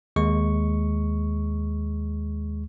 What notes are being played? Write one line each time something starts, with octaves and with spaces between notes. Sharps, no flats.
D#2 G#3 C#6